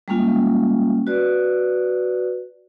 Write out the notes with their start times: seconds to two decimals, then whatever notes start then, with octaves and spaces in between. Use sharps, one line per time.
0.08 G3 G#3 A#3 C#4 F4
1.07 F#4 B4 D5